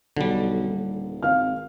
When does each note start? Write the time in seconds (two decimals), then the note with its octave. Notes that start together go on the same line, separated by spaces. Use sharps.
0.17 B1 D3 G3
0.67 D#1
1.23 G#1 F5 F6